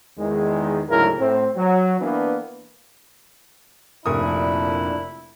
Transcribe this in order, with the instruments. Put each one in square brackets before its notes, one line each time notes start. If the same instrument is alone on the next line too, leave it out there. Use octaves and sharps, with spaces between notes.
[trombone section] E2 D#3 G#3
D2 G#2 C#3 F#3 E4 A#4
A2 C4
F#3
E3 A#3 B3 D4
[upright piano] F1 A#4 D#6 [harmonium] A#2 D4 [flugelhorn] E4